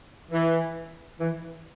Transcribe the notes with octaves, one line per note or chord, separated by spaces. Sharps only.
E3
E3